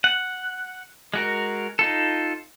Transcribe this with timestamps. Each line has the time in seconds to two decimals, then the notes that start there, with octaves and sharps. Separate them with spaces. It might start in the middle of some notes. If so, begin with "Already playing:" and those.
0.04 F#5
1.14 G#3 F#4 A#4
1.79 D#4 F4 A4